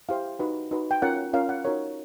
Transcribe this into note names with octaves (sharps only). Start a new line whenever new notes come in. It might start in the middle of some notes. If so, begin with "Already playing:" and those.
E4 G4 C5 F5
D#4 F#4 B4
D#4 F#4 B4
G5
C#4 F4 A#4 C#5 F#5
C#4 F4 A#4 C#5 F5
F#5
D#4 F#4 A#4 C#5